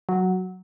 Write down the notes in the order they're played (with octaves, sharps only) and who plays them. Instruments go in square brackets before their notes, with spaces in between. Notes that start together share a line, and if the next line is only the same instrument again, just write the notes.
[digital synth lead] F#3